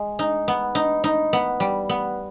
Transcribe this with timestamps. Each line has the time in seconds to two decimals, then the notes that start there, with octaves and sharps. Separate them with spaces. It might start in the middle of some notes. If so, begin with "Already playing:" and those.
Already playing: G#3
0.19 D#4
0.48 B3
0.75 D#4
1.04 D#4
1.33 B3
1.60 G3
1.89 B3